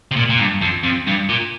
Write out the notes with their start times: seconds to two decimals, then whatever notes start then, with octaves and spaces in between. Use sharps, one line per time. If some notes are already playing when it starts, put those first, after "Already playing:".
0.12 C3
0.16 A#2
0.30 A#2
0.39 G2
0.62 F2
0.84 F2
1.07 G2
1.29 A#2